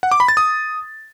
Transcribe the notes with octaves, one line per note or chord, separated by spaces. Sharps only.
F#5
D6
B5
A6
D#6